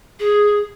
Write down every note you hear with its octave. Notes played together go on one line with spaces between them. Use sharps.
G#4